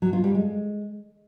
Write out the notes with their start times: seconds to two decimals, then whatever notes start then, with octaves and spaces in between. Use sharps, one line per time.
0.02 F#3
0.13 F4
0.24 G3
0.35 G#3